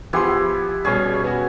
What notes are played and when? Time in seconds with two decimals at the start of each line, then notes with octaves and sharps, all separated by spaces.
0.13 F3 B3 E4 G4 G#4 C6
0.85 B2 G3 C#4 G#4
1.24 B3 F#4